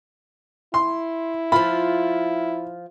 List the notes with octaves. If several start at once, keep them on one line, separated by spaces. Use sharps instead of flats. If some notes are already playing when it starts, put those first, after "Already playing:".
E4 C6
F3 F4 B5